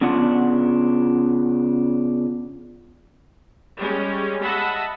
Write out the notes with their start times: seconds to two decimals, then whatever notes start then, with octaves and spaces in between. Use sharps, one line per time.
0.01 C#3 B3 D4 F4 F#5
3.78 G3 G#3 C#4
4.41 D#5 E5 F#5 A5 B5